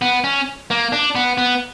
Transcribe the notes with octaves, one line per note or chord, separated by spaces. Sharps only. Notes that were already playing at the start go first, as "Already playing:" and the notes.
B3
C#4
A#3
D4
B3
B3